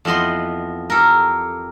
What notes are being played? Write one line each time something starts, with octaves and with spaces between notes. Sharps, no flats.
F2 E3 B3 D#5 C6
G4 A4 A#4